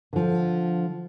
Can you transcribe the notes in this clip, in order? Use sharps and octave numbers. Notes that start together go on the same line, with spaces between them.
D3 F3